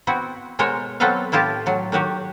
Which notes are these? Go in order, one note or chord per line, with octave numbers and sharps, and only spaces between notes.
B3 C4 E4 F#4
B2 G#3 A#4 C5 C#5
F#3 B3 C4 A4 B4 F5
A2 E4 F4 G4 A5
A2 F#3
D#3 F#3 F#4 G4